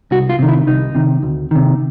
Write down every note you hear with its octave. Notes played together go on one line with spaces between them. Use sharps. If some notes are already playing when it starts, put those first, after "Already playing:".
C2 F#4
F4
C3 D#3
E4
C2 D#4
C3 D#3
D2
C3 D#3